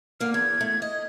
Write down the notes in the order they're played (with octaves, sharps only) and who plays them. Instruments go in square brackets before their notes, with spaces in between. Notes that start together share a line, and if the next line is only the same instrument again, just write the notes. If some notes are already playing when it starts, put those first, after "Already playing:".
[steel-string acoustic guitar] D3 A#3 [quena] F6
[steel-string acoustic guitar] E2 [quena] G#6
[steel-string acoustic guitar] A3
D#5